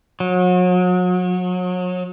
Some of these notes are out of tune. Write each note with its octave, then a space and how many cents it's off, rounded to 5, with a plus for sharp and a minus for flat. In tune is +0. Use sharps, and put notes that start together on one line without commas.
F#3 -35